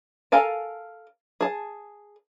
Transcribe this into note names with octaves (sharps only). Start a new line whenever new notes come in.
A4 A#4 F5 G#5 A5
G#4 A5